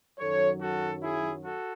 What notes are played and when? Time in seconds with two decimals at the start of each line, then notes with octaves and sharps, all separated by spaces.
0.19 F#2 D#3 F#3 A4 C#5
0.60 F#4 A4
1.03 E4 G#4
1.45 F#4 A4